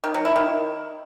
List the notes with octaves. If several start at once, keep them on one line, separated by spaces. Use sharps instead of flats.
D#3
F#3
E4
D#3